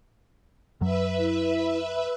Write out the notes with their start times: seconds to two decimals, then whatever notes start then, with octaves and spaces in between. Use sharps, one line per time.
0.81 F#2 F#3 B4 E5
1.18 E4